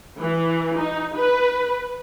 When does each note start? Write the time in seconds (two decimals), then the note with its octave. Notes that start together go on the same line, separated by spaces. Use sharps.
0.22 E3
0.78 D#4
1.16 B4